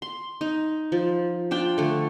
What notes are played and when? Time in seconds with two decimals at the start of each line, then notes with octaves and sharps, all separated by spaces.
0.02 C6
0.41 D#4
0.92 F3
1.51 D4 F4 G5
1.78 D3 A3